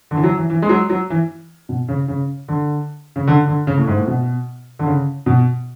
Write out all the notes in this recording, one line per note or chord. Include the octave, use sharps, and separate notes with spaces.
D3
E3
F#3
E3
E3
G#3
F#3
F#3
E3
B2
C#3
C#3
D3
C#3
D3
D3
C#3
A2
G#2
A2
B2
D3
C#3
B2